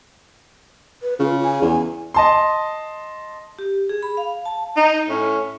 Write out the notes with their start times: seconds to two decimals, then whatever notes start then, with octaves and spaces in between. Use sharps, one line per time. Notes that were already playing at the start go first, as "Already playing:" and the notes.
1.03 B4
1.19 C#3 F4
1.43 G#5
1.62 E2
2.14 D#5 A5 C6
3.59 G4
3.89 G#4
4.03 B5
4.17 F5
4.45 A5
4.76 D#4
5.09 A2 C#4